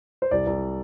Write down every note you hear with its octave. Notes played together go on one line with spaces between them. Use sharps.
C5
C2 D5
C2